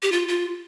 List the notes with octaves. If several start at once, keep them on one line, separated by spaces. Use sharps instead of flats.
G4
F4
F4